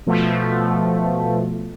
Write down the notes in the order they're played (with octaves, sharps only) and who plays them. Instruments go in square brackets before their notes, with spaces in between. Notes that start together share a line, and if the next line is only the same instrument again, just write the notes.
[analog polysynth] B2 F3 A3